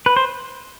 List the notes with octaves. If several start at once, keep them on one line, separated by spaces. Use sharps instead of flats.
B4
C5